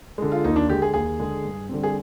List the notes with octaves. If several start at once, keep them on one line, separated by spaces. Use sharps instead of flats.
D3 G#3
F4
D#2 D#4
D4
D3 G#3 G4
G#4
D#2 G#4
D3 G#3
G2
D3 G3 C4
G#4